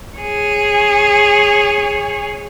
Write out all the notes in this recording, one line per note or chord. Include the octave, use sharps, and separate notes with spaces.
G#4 C#5